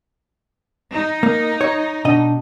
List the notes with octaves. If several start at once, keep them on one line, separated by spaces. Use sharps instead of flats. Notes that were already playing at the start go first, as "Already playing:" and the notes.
D#4
A#3
C#5
B2 D4 D#5